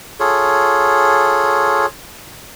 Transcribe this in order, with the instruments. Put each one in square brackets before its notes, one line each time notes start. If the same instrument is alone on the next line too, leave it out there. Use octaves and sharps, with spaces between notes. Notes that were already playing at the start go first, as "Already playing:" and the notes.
[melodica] F4 G#4 A4 C#5